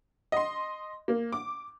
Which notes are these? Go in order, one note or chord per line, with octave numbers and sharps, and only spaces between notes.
D#5 C6
A#3
D6